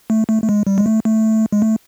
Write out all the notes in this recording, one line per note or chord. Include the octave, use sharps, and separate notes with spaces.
A3
A3
A3
G#3
G3
G#3
A3
A3
G#3
A3